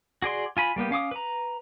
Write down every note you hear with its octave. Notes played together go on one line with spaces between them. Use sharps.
F#4 G#4 D5 C6
F4 G#5 B5
G3 A#3 B3 G4
C#4 F5 D6 D#6
B4 A#5